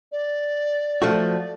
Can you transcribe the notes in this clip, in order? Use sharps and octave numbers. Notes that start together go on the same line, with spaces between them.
D5
F3 A3 F#4